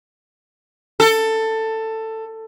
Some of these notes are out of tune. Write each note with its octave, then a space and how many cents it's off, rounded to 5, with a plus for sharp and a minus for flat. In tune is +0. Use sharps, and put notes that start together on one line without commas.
A4 +15